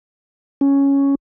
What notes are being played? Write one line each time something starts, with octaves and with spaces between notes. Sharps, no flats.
C#4